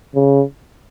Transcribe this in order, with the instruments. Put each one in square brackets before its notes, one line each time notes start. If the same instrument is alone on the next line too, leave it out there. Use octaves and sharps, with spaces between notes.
[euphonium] C#3